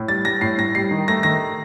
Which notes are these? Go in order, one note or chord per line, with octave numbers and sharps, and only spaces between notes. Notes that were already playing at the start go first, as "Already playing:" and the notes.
Already playing: A2
G3 A6
G3 A#6
A2 C7
A2 A#6
G3 C7
D#3
A3 A#6
D#3 A#6